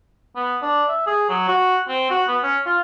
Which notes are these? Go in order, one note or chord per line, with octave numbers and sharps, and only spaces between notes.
B3
D4
E5
G#4
F#3
F#4
C4
F#4
B3
C#4
F4